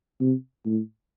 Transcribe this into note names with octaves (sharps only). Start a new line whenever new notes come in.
C3
A2